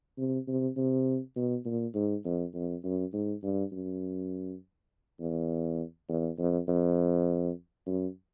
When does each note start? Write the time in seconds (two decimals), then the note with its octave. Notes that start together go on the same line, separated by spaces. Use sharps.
0.18 C3
0.48 C3
0.77 C3
1.36 B2
1.65 A#2
1.95 G#2
2.25 F2
2.54 F2
2.84 F#2
3.13 G#2
3.43 G2
3.72 F#2
5.20 E2
6.08 E2
6.39 F2
6.68 F2
7.87 F#2